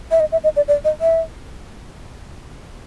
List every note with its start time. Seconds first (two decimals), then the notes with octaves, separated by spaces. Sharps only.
0.11 E5
0.20 D#5
0.32 E5
0.44 D#5
0.57 D5
0.68 D5
0.85 D#5
1.01 E5